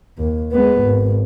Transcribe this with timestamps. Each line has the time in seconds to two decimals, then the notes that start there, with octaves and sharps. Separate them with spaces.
0.18 D#2
0.52 G#3 B3
0.81 G#1